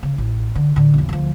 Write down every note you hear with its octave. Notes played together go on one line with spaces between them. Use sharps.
C#3
A1
D3
A2 D3
B1 F2
D2 F3